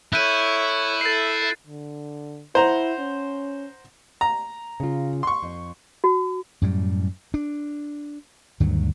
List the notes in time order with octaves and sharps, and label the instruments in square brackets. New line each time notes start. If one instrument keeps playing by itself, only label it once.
[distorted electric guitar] E4 [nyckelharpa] A4 C#5 [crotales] F#6 G6 D#7
[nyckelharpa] A4 E5 [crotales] A6 C7
[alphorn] D3
[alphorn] E4 [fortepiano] C5 F#5 A#5
[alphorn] C#4
[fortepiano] A#5
[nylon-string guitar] C#3 F4
[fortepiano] C6 C#6
[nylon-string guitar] F2
[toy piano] F#4
[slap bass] F#2 A2 G3
D4
D2 G2 D#3 F#3